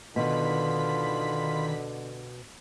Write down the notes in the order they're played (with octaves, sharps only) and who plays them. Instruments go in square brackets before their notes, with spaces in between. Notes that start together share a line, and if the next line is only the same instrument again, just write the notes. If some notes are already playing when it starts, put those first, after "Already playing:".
[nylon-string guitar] B2 [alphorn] D3 [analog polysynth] D#3 B5 B6 [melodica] F4